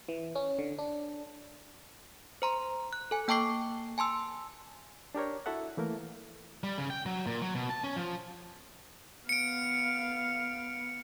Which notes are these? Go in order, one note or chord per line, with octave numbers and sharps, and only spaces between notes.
E3
C#4
D3
D4
C5 A#5 C6
F#6
A4 G#5
A#3 G5 A5 C#6 D6 C7
G#5 A5 C6 E6
D4 G4 A#4 C#5
E4 F#4 A4 E5 F#5
E3 A3 A#3 A#4
G3
C#3
G5
F#3
A#2
F#3
B2
A5
C#4
F3
B3 F5 C#7 D7